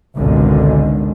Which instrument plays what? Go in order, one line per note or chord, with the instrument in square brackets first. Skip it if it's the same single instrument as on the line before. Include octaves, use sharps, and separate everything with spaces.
[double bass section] G#1 C#2 B2 D3 D#3 G#3